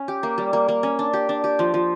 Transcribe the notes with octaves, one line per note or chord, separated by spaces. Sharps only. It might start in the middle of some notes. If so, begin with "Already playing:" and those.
Already playing: C#4
G4
A#3
G3
A#3
A#3
C#4
D4
G4
D4
G4
F3
F3